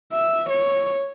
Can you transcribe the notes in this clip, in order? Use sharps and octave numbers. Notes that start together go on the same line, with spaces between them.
E5
C#5